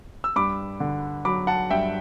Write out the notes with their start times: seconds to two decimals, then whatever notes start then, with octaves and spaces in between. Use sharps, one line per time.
0.24 E6
0.36 G2 B5 D6
0.80 D3
1.25 F#3 B5 D6
1.47 F#5 A5
1.70 G2 E5 G5